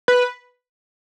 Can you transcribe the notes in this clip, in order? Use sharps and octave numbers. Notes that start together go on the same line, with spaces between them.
B4